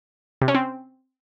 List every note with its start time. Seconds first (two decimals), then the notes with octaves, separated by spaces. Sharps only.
0.41 C3
0.48 C#4
0.55 C4